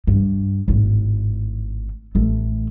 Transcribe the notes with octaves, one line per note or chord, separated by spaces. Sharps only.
G2
G#1 A2
A1 A3